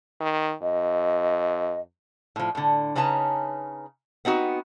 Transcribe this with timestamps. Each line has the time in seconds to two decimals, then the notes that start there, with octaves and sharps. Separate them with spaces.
0.20 D#3
0.62 F2 D#5
2.36 A2 F3
2.55 A2 D3
2.95 C#3 C#4 D#4 B4 A5 A#5
4.25 B3 C4 D#4 F#4